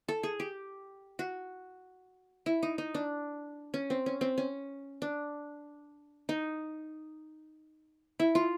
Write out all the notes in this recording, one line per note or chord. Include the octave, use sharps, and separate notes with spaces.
A4
G#4
G4
F#4
E4
D#4
D#4
D4
C#4
C4
C#4
C4
C#4
D4
D#4
E4
F4